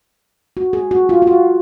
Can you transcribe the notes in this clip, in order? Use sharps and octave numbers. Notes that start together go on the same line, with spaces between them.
F#4
G#4
F#4
F4
F4
F#4